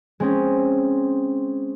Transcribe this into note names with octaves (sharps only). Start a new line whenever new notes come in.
G#3 C4 C#4